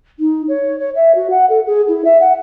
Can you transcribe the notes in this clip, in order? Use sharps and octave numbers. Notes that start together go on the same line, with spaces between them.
D#4
C#5
C#5
E5
F#4
F#5
A4
G#4
E4
E5
F#5